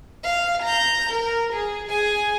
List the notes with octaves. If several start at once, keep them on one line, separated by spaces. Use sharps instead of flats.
F5
A#5 G6
A#4
G#4
G#4 G#5